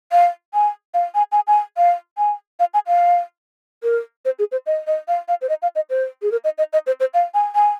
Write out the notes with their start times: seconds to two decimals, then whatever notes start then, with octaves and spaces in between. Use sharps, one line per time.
0.12 F5
0.54 G#5
0.94 F5
1.15 G#5
1.32 G#5
1.47 G#5
1.77 F5
2.18 G#5
2.60 F5
2.74 G#5
2.87 F5
3.83 A#4
4.25 C5
4.39 G#4
4.52 C5
4.66 D#5
4.87 D#5
5.08 F5
5.28 F5
5.42 C5
5.49 D#5
5.62 F5
5.75 D#5
5.90 C5
6.22 G#4
6.32 A#4
6.44 D#5
6.58 D#5
6.73 D#5
6.87 C5
7.00 C5
7.14 F5
7.34 G#5
7.55 G#5